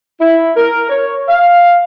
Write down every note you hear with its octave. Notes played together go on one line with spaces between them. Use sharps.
E4
A#4
C#5
F5